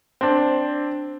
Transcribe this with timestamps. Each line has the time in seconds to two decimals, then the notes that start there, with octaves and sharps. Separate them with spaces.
0.21 C4 D4